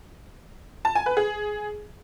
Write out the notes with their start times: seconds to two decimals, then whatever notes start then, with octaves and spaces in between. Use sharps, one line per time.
0.85 A5
0.95 G#5
1.06 B4
1.17 G#4